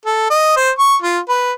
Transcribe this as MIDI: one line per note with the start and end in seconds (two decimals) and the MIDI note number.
0.06 0.30 69
0.30 0.54 75
0.56 0.70 72
0.79 0.96 85
1.02 1.19 65
1.29 1.52 71